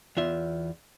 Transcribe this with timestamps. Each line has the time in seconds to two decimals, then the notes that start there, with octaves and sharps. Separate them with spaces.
0.17 E2 F4 E5